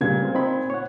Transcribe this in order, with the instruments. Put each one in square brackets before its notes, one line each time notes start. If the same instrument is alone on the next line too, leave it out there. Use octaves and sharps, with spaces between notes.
[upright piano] A#2 G#6 [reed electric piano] C#3 G3
[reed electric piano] G#3 C4 F4
C4 D#4 B5
C#5 F#5